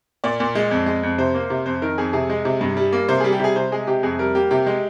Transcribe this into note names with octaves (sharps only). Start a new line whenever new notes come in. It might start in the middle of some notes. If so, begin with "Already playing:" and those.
A#2 D5
A#2
G#3
F2
G#3
F2
C3 C5
A#3
C3
F2 C5
D#3 A#4
F2 G#4
C3 G#4
G#3
C3
G2
G3
A#3
C3 C5
G3 G#4
G4
C3 G#4
C3 C5
G#3 G#4
C3 G4
F2 G#4
G3 A#4
A#3 G4
C3 G4
G#3